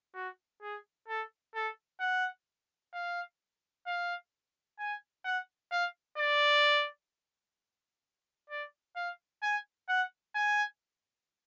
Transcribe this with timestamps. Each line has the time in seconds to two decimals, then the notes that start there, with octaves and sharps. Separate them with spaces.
0.15 F#4
0.62 G#4
1.08 A4
1.55 A4
2.00 F#5
2.94 F5
3.87 F5
4.79 G#5
5.25 F#5
5.71 F5
6.17 D5
8.50 D5
8.96 F5
9.43 G#5
9.89 F#5
10.35 G#5